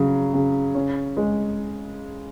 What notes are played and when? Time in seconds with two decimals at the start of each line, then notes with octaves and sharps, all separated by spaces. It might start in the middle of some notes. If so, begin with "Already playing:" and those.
Already playing: C#3 F#3
0.34 C#3
0.75 C#4
1.17 G#3